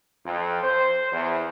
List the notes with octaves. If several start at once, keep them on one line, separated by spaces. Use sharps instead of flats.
F2
C5
E2